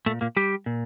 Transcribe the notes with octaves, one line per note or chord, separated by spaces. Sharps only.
A#2 A3
A#2 A#3
G3 G4
A#2